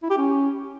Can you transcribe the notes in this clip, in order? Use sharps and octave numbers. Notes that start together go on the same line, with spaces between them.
E4
G4
C#4